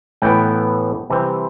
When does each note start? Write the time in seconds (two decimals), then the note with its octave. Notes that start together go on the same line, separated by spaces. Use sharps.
0.22 A2 E3 B3 G5
1.10 C3 E3 G3 C4